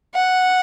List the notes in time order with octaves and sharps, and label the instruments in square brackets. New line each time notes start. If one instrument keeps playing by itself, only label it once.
[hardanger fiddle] F#5